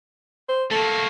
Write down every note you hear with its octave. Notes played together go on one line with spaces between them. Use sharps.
C5
A3 A#3 A4